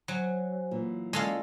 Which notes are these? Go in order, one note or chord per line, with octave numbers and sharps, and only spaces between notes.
F#3 C5 G#5
A#2 E3
G#3 C#4 A4 D5 F5